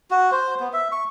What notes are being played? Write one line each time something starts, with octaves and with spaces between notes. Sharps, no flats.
F#4
C5
B3
E5
C#6